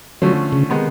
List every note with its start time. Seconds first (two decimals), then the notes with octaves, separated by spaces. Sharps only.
0.22 D3 F3 F#3 A3 C#4
0.53 C#3
0.69 C3 D#3 G#3 B3